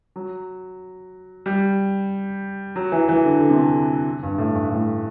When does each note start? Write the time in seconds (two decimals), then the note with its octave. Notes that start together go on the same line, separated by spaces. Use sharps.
0.16 F#3
1.46 G3
2.76 F#3
2.92 E3
3.09 E3
3.25 D3
3.40 D3
3.50 C3
3.57 D3
4.23 G2
4.38 A2
4.55 G2
4.72 A2